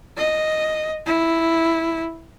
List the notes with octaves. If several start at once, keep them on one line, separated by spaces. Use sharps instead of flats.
D#5
E4